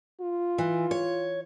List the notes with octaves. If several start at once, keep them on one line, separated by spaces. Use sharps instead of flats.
F4
E3
C#5